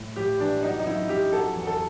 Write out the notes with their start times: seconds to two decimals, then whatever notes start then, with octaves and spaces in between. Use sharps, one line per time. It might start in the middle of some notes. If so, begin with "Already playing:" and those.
Already playing: A2
0.16 A2 G4
0.40 E3 D4
0.63 F#3 D#4
0.80 D#4
0.87 F#2 E4
1.09 F#2 G4
1.32 F#3 A4
1.55 E2
1.67 A4